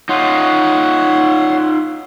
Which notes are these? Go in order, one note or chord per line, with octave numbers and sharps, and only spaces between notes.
D#4 F4 C#5 F#5 C6